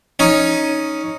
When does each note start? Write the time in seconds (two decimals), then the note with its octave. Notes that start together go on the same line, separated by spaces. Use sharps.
0.19 C#4 D#4